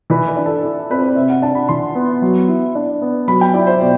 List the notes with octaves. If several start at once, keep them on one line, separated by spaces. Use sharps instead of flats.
E3 B4
B4
D4
A4
E4 D5
C4 B4
C5
D5
C3 E5
F#5
D4 A5
B5
E3 C6
B3
F#3
E4
D4
B3
F#3 B5
G5
E4 D5
C5
B2 D5